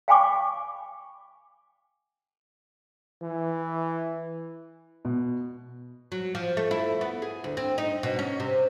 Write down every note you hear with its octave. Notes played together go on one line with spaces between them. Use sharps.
F5 G5 G#5 B5 C#6 D6
E3
B2
F#3
F3
A3
E4
B3
G#4
D2
C4
D#4
B2
C#4
C3